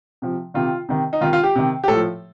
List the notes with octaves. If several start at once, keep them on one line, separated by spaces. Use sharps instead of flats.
C3 F3
C3 D#3 F4
C3 D#3
D#4
C3 D#3 F4
F4
G4
C3 D#3
G4
A2 F3 A4